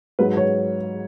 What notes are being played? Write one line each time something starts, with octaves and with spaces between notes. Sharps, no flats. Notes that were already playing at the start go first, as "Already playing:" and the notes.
G#2 F#3 B4
C#5